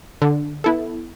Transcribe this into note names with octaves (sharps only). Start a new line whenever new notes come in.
D3
B3 E4 A4